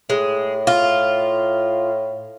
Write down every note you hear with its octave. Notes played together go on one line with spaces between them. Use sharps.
A2 G#3
F4